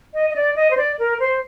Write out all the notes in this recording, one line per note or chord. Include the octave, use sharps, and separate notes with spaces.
D#5
D#5
D5
D#5
C5
D5
A#4
C5